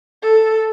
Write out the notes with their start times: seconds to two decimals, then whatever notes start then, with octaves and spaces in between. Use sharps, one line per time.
0.22 A4